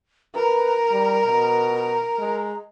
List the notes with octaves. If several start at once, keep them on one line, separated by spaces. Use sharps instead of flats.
A#4 B4 A#5
G3
B2
A#5
G#3